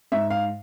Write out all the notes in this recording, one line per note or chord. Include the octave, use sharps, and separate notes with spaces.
G#2 E5
F5